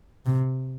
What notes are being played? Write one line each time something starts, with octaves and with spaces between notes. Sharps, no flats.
C3